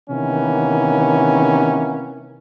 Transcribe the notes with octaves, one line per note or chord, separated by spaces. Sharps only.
C3 D#3 E3 A#3 B3 C#4